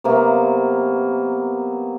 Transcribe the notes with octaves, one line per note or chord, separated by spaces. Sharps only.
C3 F#3 A#3 B3